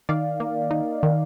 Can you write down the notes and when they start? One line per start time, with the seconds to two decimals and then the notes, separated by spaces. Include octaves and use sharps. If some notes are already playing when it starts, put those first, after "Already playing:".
0.09 D#3 D5 F5
0.40 A#3
0.71 D#4
1.03 D#3